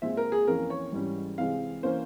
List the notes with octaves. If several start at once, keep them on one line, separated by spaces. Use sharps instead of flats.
A#2 G#3 C4 E5
A#4
G#4
F2 E3 A#3 C#4 A#4
C#5
G#2 E3 G3 C#4
C3 E3 G#3 C4 F5
E3 A#3 C#4 C5